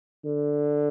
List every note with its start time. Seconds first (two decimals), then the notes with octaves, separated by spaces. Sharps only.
0.25 D3